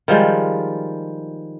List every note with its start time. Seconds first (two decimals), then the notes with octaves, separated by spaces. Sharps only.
0.08 D#3 F3 G3 G#3